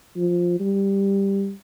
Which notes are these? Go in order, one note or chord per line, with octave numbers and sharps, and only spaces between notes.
F3
G3